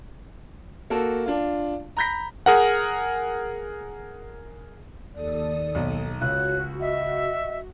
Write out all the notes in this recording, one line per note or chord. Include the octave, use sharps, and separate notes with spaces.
A#3 F#4 A4
D4 F4
A#5 B5 G6 A#6 B6
G#4 A#4 F#5
D#2 A4 D5 D#6
B1
C#2 F#4 C#5 F#6
D#5 E5